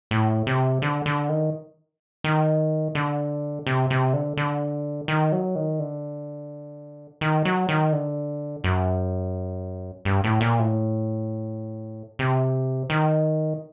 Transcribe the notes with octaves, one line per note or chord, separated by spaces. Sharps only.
A2
C3
D3
D3
D#3
D#3
D3
C3
C3
D3
D3
D#3
F#3
D#3
D3
D#3
F#3
D#3
D3
F#2
G2
A2
A#2
A2
C3
D#3